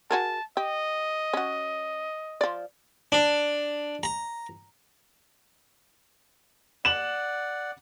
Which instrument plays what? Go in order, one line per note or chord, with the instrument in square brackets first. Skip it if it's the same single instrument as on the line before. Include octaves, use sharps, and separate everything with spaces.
[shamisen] F#4 G#4 A#4 [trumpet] A5
[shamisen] G4 [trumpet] D#5
[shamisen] C#4 F#4
F3 D5
[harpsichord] D4
A#5
[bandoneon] D5 F#5 [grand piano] E7 F#7